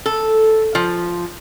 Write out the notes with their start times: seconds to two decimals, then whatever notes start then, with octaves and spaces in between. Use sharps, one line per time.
0.06 A4
0.75 F3